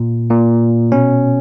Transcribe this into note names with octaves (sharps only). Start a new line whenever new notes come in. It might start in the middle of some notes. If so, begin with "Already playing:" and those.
Already playing: A#2
A#2
B2 C#4